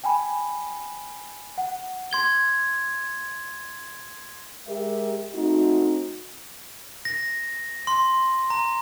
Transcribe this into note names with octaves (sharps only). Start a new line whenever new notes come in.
G5 G#5 B5
F#5
C6 G#6 G7
G#3 G4 A#4 E5
A3 C4 D#4 F#4
A#6
C6
A#5